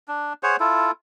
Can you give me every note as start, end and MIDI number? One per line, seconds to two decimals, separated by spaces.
0.08 0.33 62
0.43 0.56 68
0.43 0.56 72
0.43 0.56 73
0.43 0.56 78
0.60 0.91 64
0.60 0.91 65
0.60 0.91 69